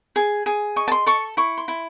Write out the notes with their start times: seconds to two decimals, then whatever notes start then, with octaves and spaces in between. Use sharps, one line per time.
0.16 G#4
0.46 G#4
0.76 D#5 C#6
0.88 A5
0.92 C6
1.06 A4 C#6
1.37 E4 C#6
1.57 C6
1.68 E4